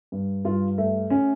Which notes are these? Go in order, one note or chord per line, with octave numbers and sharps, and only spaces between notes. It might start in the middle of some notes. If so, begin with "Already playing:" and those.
G2
G2 F4
A3
C#4